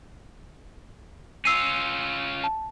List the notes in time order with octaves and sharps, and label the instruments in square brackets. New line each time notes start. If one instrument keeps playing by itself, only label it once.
[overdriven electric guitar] C#4 F4 [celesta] E6 C7 D#7
[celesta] A5